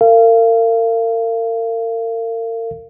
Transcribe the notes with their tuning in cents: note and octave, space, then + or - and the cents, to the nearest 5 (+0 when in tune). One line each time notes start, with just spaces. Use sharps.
A#4 -40 F5 -30